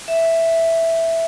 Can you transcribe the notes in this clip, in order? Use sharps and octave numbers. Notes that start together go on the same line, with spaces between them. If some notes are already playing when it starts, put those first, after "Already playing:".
E5